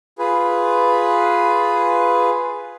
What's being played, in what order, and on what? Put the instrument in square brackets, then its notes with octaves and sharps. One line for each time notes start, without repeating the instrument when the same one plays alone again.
[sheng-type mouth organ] F4 G#4 B4